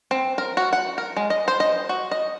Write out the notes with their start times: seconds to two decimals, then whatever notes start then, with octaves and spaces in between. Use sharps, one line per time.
0.11 C4
0.38 A#4
0.57 F#4
0.73 F#5
0.98 A#4
1.16 G#3
1.30 D#5
1.48 C5
1.60 D#5
1.89 F#4
2.11 D#5